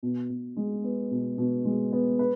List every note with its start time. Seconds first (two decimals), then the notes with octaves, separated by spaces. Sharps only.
0.03 B2
0.30 B2
0.57 G#3
0.84 B3
1.11 B2
1.38 B2
1.65 G#3
1.92 B3
2.19 B4